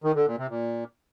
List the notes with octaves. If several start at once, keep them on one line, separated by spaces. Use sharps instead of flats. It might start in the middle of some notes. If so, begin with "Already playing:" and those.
D#3
D3
A#2
C3
A#2